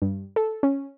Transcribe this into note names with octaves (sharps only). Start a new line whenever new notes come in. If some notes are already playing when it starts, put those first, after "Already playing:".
G2
A4
C#4